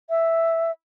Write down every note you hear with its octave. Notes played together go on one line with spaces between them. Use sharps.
E5